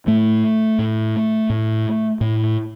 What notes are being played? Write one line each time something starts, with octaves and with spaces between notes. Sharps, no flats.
A2 A3
A2
A2
A2